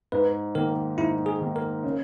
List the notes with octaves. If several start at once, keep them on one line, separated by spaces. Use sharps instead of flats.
G#2 B4
D#3 A#3 A#4
G#2 E4
G#4
D#3 A#3
A#4
C#3